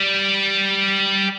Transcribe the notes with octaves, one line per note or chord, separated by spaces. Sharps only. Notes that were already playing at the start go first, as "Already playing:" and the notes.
Already playing: G3